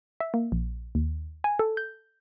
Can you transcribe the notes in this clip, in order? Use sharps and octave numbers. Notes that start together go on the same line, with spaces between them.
E5
A#3
A#1
D#2
G#5
A4
G6